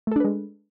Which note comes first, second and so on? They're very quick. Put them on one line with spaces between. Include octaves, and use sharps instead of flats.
A3 A4 D4 B4 G#3